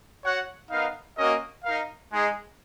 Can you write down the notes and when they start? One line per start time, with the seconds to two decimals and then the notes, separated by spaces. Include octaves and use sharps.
0.24 F#4 C#5 F#5
0.71 B3 D#4 A#4 F5
1.18 A#3 C#4 F#4 A#4 D#5
1.64 D#4 A#4 F5
2.10 G#3 D#4 G#4